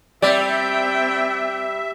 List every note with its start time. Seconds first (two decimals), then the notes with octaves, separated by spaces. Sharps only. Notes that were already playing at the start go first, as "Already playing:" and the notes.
0.22 G3 C4 D5 E5 G5